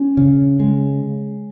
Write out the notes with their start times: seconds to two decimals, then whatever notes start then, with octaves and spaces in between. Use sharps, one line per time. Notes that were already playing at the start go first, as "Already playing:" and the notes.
Already playing: C#4
0.17 C#3
0.60 G#3